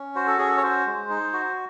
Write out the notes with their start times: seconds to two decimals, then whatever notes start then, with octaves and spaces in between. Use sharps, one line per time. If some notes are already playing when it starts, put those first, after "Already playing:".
Already playing: C#4
0.15 F#4 C5
0.27 A4
0.38 C#4 G#4
0.48 A4
0.58 C#5
0.63 F#4 C5
0.86 G#3
1.10 D#4
1.33 F#4